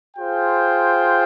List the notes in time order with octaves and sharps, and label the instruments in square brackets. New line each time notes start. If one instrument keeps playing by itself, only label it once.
[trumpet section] F4 G#4 C5 G5